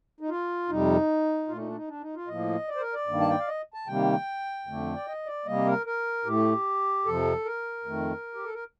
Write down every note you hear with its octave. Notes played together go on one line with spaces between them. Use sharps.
D#4
F4
F2 C3 G3 D#4
A#2 A3 F4
D#4
D4
D#4
D4
D#4
F4
A2 F3 A#3 D#5
D5
C5
A#4
D5
G2 D#3 A#3
A5
G5
F5
D#5
A5
C3 D#3 G3 A#3 G5
F2 D3 A3
D5
D#5
D5
C3 G3 A#3 D#5
A#4
A#4
A2 A3 G4
F2 C3 F3 A4
A#4
F2 D#3 A3
G4
A4
A#4